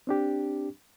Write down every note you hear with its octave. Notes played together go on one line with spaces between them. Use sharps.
C4 D4 G4